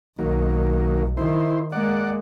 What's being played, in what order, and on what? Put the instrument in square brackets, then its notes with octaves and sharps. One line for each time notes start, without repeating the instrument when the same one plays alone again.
[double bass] B1 [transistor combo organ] D#3 F#3 A#3
[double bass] D#3 [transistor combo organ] E4 C5
[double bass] G#3 A#3 [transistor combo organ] D5 F#5